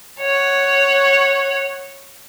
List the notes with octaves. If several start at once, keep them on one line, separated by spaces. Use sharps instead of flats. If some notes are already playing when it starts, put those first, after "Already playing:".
C#5 F#5